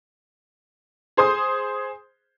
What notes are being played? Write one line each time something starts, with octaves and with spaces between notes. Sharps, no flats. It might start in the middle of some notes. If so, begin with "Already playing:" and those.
G#4 C5 C6 D#6